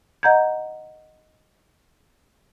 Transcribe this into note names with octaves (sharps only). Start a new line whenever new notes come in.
D#5 F#5 A#5 G6 G#6